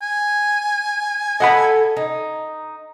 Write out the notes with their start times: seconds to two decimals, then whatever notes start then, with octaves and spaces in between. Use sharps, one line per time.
0.02 G#5
1.40 A4 D#5 F#5 B5
1.97 D#4